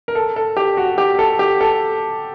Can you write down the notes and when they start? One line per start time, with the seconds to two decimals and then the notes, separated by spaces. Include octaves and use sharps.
0.08 A#4
0.15 A4
0.36 A4
0.57 G4
0.77 F#4
0.98 G4
1.19 A4
1.39 G4
1.61 A4